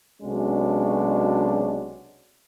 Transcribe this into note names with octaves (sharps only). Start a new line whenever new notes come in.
B1 C3 G#3 C#4 D4 F#4